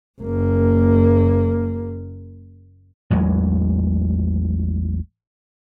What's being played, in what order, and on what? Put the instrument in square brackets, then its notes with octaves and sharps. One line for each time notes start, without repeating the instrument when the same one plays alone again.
[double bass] F#1 A#3
[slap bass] A1 E2 F#3 G#3